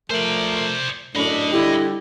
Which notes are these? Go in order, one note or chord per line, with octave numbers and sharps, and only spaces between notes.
F3 A3 A#4 C5 D5
F#2 A2 D4 D#5 B5
D3 G3 E4 G4